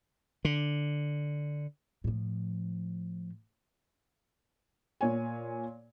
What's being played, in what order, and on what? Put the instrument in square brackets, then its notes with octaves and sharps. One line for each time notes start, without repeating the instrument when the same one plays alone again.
[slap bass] D3
[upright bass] A2 F3
[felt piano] A#2 C#5 G#5